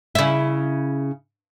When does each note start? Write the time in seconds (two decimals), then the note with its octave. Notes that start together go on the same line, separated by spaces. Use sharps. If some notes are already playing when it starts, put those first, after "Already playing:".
0.15 C#3 E4